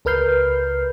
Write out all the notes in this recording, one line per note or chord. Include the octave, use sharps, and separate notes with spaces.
C#2 A#4 B4 F6 G6 C7